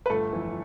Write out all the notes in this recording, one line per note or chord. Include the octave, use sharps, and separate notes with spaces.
B4
G1 A3 A4
F2 E3